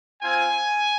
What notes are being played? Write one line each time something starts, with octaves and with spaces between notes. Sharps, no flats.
C4 F4 G#5